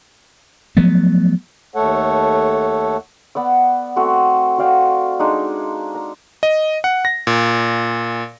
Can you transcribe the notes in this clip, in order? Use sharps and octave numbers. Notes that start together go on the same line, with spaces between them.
F3 F#3 A3 B3
D#2 A3 A4 C#5 F#5
B3 D5 E6
A3 C4 F#4
F#4 D5 F5 G5
G#3 D4 D#4
A#5
D#5
F#5
A#6
A#2